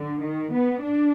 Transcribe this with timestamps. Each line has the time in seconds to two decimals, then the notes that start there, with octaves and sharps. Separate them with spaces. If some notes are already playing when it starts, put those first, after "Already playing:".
Already playing: D3
0.23 D#3
0.53 B3
0.82 D4